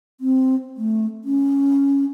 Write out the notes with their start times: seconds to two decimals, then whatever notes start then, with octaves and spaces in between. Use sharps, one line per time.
0.21 C4
0.77 A3
1.24 C#4